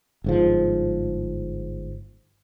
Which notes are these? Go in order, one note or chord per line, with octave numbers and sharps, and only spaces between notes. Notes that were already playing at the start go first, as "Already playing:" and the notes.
G1 G#2 F3